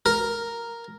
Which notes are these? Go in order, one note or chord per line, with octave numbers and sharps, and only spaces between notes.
A#4